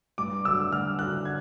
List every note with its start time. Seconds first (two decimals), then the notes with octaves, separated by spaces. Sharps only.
0.18 G2 D6
0.45 D3 F#3 E6
0.72 G2 F6
0.99 D3 F#3 F#6
1.25 G#6